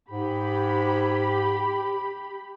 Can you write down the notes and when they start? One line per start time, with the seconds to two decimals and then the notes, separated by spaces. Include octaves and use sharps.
0.10 G#2 G4 B5